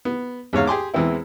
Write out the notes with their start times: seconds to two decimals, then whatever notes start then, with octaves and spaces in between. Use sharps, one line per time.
0.05 B3
0.53 E2 G#2 C#5 F5
0.67 G4 G#4 C6 D6
0.94 E2 E3 G#3 C4 E4